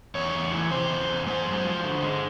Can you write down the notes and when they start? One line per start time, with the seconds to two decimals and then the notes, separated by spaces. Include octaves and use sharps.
0.15 E2 C#5
0.34 E2
0.53 E3
0.71 C3 C5
0.90 E2
1.09 E2
1.27 G#3 C5
1.45 F#2
1.65 F3
1.83 D3
2.03 G#3